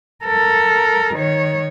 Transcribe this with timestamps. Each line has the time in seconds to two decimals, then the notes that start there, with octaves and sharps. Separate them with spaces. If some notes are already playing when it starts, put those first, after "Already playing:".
0.25 A4 A#4
1.14 D#3 C#5